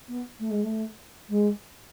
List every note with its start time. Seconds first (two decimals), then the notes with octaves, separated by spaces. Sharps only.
0.08 B3
0.40 A3
0.50 G#3
0.63 A3
1.29 G#3